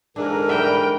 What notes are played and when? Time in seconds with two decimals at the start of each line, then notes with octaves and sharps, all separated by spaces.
0.16 G#2 D3 E3 D4 A#4
0.49 G3 E5 G5